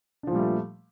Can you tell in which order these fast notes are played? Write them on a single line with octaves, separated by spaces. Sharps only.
D4 F3 A#2 G3 A3